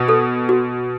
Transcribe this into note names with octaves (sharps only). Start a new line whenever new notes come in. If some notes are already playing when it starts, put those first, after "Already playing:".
Already playing: B2 F#4
A4
F#4